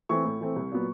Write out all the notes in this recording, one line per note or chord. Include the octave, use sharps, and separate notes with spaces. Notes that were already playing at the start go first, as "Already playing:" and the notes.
E3 A3 C4 C#6
A2
E3 A3 C4
C2
A#2 F#3 B3